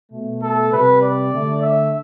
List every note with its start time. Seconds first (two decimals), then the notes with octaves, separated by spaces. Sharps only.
0.12 B2 A3
0.42 A4
0.72 C3 G3 B4
1.03 D5
1.32 D3 A3
1.62 E5